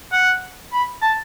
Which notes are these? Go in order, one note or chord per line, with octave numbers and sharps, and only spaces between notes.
F#5
B5
A5